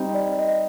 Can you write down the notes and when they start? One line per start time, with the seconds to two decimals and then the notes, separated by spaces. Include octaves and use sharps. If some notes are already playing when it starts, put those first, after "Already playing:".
Already playing: G3 C4 D#4
0.14 D5
0.38 D#5